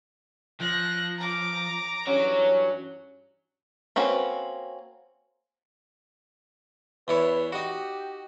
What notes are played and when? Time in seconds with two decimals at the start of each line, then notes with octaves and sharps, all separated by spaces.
0.60 F3 F#6 A#6
1.18 A#5 D6
2.07 G2 E3 C#4 F#4 C#5
3.96 A#3 C4 C#4 F#4 B4
7.08 E2 E4 B4 C#5
7.52 D#4 F#4 G4